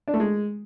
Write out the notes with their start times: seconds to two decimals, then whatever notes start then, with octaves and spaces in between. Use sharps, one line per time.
0.08 D4
0.14 A3
0.20 G#3